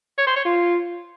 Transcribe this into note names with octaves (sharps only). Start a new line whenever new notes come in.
C#5
C5
C#5
F4